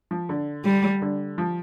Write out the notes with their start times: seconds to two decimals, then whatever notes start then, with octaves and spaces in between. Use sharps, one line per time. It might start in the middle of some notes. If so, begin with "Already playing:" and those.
0.11 F3
0.29 D3
0.65 G3
1.02 D3
1.38 F3